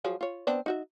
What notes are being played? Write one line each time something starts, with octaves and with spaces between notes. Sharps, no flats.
F3 F#3 G#4
F4 C#5
B3 C4 D4
D#4 F#4 E5